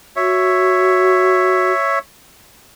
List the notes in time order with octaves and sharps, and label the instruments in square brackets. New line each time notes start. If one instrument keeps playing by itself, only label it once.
[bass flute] F#4 [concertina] C#5 E5